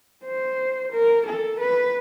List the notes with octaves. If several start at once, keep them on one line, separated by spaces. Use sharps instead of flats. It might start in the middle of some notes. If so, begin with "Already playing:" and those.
C5
A#4
A4
B4